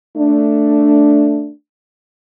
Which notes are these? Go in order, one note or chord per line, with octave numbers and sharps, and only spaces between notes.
A3 D4